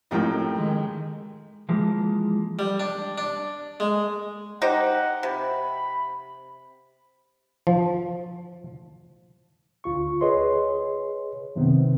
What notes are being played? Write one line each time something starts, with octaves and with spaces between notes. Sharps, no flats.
F2 A2 D#4 G4 A#4 G5
D#3 G#3
E3 F3 G#3 A#3
G3
D4
D4
G#3
D#4 G4 C5 F#5
C3 B5
F3
D2 F4 C#6
G#4 B4 C#5 D#5 C6
F#2 C3 D#3 B3 C4